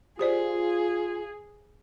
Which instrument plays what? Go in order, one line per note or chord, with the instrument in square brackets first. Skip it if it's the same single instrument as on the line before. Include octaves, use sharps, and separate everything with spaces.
[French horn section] F4 [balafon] G4 C5 D5 [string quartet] G#4